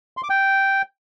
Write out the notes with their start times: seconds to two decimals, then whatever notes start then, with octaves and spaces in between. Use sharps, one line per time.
0.17 C6
0.23 D6
0.30 G5